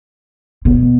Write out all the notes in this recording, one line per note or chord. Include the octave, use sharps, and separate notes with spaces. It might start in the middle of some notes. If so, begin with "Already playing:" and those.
B2